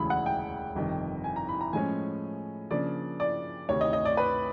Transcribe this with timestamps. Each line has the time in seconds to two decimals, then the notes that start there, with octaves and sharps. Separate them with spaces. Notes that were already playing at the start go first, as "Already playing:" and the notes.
Already playing: E1 D2 C#3 E3 B5
0.10 F#5
0.26 G5
0.75 G1 F2 C3 D#3
1.24 G#5
1.36 A#5
1.49 B5
1.61 A#5
1.73 A2 F3 G#3 C#4 G#5
2.71 C#3 F3 A#3 D4 D5
3.20 D5
3.69 D2 C3 D#3 C#5
3.81 D#5
3.93 D#5
4.05 D5
4.17 B4